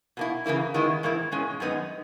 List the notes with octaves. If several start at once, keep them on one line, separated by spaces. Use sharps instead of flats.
B2 A#3 E4
C#3 E3 A#3 E4
D#3 G#3 B3 E4
G#2 E3 A#3 E4
B2 G#3 C#4
F#2 D#3 G#3 B3 D#4